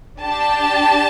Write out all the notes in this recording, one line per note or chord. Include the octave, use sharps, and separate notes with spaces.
D4 G4 A5